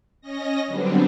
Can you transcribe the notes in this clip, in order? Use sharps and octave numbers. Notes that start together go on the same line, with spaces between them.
C#4 D#5 A#6
D3 F#3 G3 B3 C4 D4